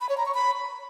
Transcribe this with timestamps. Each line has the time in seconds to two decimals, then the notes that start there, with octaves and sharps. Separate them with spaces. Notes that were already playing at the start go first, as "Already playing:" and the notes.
0.01 B5
0.09 C#5
0.18 A#5
0.26 C#6
0.34 B5